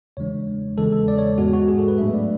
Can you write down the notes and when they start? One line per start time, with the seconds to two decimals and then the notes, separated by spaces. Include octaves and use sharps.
0.17 E2 C#3 E3 G#3 D4 C#5
0.78 E2 C#3 E3 G#3 A4
0.92 A4
1.08 D5
1.18 C#5
1.38 G#2 G#3 B3 F#4
1.53 F#4
1.68 G#4
1.79 A4
1.88 B4
1.98 A2 F#3 A3 D4 E5
2.14 D5